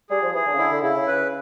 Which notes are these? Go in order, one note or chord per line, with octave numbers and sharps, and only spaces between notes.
G3 G#4
F3
E3 G#4
D3
C#3
D3 E4
D3
C#3 E4
C#3
C#3 B4